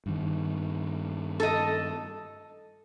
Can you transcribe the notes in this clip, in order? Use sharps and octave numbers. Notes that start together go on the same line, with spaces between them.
G2 D#3
A4 D#5